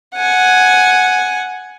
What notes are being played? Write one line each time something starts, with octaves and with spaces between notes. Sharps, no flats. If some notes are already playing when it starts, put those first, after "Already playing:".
F#5 G#5